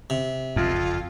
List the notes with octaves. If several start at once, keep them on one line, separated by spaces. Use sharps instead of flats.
C3
F#1 B1 F2 F4